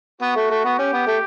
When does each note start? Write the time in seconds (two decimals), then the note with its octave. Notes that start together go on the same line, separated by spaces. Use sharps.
0.21 B3 F#4
0.36 A3
0.50 A3
0.65 B3
0.79 C#4 G4
0.93 B3
1.07 A3